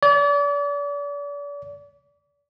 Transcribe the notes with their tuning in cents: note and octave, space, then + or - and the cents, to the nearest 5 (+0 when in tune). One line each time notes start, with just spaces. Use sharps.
D5 -40